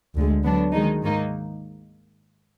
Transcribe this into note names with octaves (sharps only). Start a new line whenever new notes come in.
D2 D3 G#3
D3 F#3 B3 D4
D#3 G#3 D#4
G#2 D#3 A#3 D#4